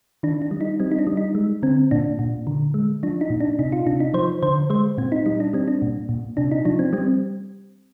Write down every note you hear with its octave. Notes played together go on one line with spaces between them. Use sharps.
D#3 D4
D4
G3
D#4
G3 C4
D#4
D4
G3
D#4
G#3
D3 C4
A#2 D4
A#2
D3
G#3
F3 D4
D#4
A#2
D4
C3 D#4
F4
C3 D4
D#4
F3 C5
D3 C5
G#3 C5
A#2 C4
D#4
G3 D#4
D4
G3 C4
D4
A#2
A#2
C3 D4
D#4
F3 D4
C4
G3 C4